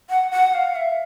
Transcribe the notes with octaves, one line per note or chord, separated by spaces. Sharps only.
F#5
F#5
F5
E5